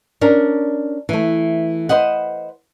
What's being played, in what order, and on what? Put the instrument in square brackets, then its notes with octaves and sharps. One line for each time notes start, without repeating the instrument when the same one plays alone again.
[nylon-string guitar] C#4 D4 A#4
E3 A3
B4 C5 D#5 F#5